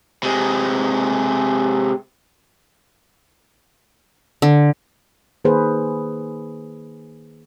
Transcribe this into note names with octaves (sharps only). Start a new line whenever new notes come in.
C3 G#3
D3
D#3 A#3 G#4 B4 C5